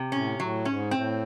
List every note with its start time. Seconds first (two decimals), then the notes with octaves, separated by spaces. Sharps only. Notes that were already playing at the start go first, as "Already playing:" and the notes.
Already playing: C3
0.12 A2 C#4
0.39 A2 F#3
0.65 G#2 C#4
0.91 A2 C4